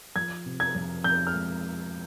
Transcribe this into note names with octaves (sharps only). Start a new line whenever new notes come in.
F3 G#6
C3
G#6
F2
F2 G6
F6
G#3